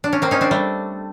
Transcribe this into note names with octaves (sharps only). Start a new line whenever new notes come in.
D4
C#4
A#3 C4
C#4 D#4
C4 D4
G3 A3